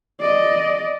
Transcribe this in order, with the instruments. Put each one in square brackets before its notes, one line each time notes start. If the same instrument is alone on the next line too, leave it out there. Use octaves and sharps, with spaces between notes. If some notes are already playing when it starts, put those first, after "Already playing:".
[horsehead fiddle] D5 D#5